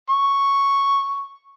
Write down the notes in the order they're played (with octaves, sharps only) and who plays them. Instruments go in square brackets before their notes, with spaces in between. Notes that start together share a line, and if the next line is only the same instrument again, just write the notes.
[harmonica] C#6